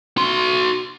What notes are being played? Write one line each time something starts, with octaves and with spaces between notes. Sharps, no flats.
F#4 C6